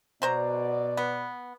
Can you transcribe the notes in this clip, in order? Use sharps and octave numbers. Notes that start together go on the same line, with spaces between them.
B2 F#3 C5 D5 A#5
B3